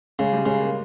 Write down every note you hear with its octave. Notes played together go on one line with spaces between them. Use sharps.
C#3 G#3
G3
C#3 G#3
A#3